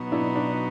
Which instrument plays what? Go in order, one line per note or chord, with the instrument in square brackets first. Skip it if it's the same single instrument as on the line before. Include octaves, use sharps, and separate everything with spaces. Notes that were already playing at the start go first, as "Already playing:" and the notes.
Already playing: [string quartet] B2 F#3 B3 D#4 F#4
[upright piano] D4 E4
D4